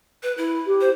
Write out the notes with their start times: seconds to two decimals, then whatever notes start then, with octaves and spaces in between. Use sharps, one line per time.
0.23 B4
0.38 E4
0.67 G4
0.81 C5